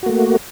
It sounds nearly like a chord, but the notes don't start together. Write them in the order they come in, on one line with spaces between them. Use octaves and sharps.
F#4 A#3 A3